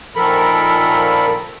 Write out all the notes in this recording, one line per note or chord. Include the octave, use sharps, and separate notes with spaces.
A#2 D#3 F3 A4 A#4 B5